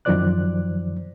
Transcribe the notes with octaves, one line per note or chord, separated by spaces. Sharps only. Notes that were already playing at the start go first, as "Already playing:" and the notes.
F#2 D#3 F3 C5 D5 F#6